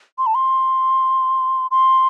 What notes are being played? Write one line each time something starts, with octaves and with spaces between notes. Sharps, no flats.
C6
A5
C6
C6